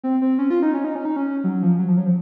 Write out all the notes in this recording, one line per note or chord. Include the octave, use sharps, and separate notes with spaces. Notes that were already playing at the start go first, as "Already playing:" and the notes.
C4
C4
C#4
F4
D#4
C#4
D#4
C#4
D#4
C#4
F#3
F3
F#3
F3
F#3
F3